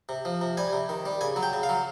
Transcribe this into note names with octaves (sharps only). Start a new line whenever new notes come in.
C3
F3
C3
G3 G#5
C3
D#3
G3
C#3 G#5
F#3
G5
C#3
F5
F#3